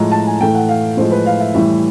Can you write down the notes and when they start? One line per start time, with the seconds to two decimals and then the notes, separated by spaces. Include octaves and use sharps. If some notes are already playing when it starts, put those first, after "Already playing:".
Already playing: A2 F3 G#3 A#5
0.11 A5
0.27 G#5
0.41 A2 E3 A3 G5
0.55 F#5
0.69 F5
0.97 A2 F3 G#3 C5
1.12 B4
1.26 F5
1.40 E5
1.54 A2 E3 G3 E5